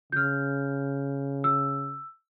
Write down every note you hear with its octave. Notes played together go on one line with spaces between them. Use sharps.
C#3 F6 G6
E6